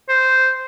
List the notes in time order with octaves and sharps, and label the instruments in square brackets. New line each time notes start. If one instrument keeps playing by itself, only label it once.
[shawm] C5